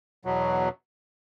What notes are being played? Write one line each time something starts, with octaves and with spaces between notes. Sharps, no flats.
E2 B2 F#3